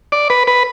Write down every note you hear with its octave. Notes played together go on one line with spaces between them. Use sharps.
D5
B4
B4